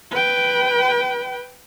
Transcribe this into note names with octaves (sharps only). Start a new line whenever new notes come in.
B4 G5